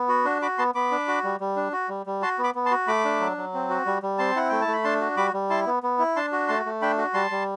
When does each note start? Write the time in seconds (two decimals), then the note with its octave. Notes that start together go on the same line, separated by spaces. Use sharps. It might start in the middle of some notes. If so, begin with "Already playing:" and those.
Already playing: B3
0.09 F#4
0.25 D4
0.42 F#4 B5 D6
0.58 B3 A5 C6
0.75 B3 B5 D6
0.91 D4
1.08 F#4
1.24 G3
1.40 G3
1.56 D4
1.73 F#4
1.89 G3
2.06 G3
2.22 F#4 A5 C6
2.39 B3
2.44 B5 D6
2.55 B3
2.65 A5 C6
2.71 F#4
2.87 A3 B5 D6
3.05 D4
3.20 F#3
3.37 F#3
3.54 C4
3.70 F#4
3.86 G3
4.03 G3
4.19 C4 A5 C6
4.36 E4 F#5
4.49 A3 G5
4.61 A5
4.68 A3 B5
4.84 D4 A5 C6
5.01 F#4
5.17 G3 B5 D6
5.34 G3
5.50 E4 A5 C6
5.66 B3
5.83 B3
5.99 E4
6.16 D4 A5 C6
6.32 F#4
6.48 A3 A5 C6
6.65 A3
6.82 D4 G5 B5
6.98 F#4
7.14 G3 A5 C6
7.31 G3